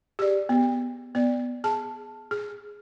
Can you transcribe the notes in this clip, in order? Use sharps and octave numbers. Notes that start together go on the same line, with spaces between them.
G4 G#4 D5
B3
B3 D5
G#4 A5
G#4